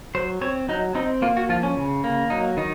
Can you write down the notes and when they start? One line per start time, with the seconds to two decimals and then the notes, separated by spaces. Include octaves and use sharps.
0.15 F#3 C5
0.41 C4 C#5
0.69 F#3 D#4
0.95 C4 D#4
1.22 A#3 F4
1.37 F#4
1.49 F3 F4
1.63 C#4
1.77 C#3
2.04 A#3
2.30 F#3 D#4
2.57 D#3 D#4